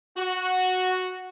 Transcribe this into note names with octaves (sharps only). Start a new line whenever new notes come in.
F#4